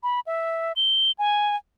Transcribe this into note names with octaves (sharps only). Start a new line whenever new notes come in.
B5
E5
G7
G#5